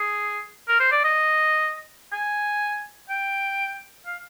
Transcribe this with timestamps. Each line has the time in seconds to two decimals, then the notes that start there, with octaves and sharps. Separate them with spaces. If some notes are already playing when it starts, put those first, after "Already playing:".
Already playing: G#4
0.68 A#4
0.80 C5
0.92 D5
1.04 D#5
2.13 G#5
3.10 G5
4.06 F5